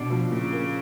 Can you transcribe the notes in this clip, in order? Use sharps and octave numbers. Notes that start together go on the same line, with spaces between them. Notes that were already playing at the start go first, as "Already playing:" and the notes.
Already playing: B2 D4
F3
A#2 C#3
A#3